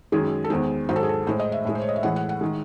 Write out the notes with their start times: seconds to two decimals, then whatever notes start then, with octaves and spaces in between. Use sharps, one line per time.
0.12 F#2 D#3 G#3 G#4
0.44 A4
0.50 E2 D#3 G#3 C5
0.89 G#2 D#3 F#3 C5
0.96 A4
1.03 G#4
1.09 A4
1.27 A2 G#3 C5
1.40 D#5
1.52 E5
1.65 A2 G#3
1.75 C5
1.82 C#5
1.89 D#5
1.96 E5
2.03 A2 E3 G#3 F#5
2.16 F#5
2.29 F#5
2.41 D#3 G#3